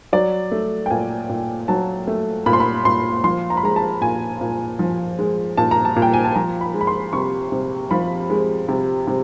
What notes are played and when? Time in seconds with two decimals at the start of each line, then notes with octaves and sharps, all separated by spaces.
0.13 F#3 D5
0.52 A3
0.86 G5
0.90 A#2 G#5
1.29 A#2
1.68 F#3 A5
2.07 A3
2.46 A#2 B5
2.53 C6
2.60 B5
2.85 A#2 C6
3.24 F3 C6
3.50 A#5
3.57 B5
3.63 G#3 A#5
3.76 A5
4.01 A#2 G#5
4.41 A#2
4.79 F3
5.19 G#3
5.57 A#2 A5
5.71 A#5
5.85 A5
5.96 A#2
6.02 G5
6.14 G#5
6.25 A5
6.35 F3 A#5
6.61 B5
6.74 G#3
6.81 B5
6.87 C6
7.13 C3 C#6
7.52 C3
7.91 F3 B5
8.30 G#3
8.68 C3
9.07 C3